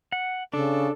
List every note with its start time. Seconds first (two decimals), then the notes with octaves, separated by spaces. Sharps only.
0.12 F#5
0.53 C#3 D4 A4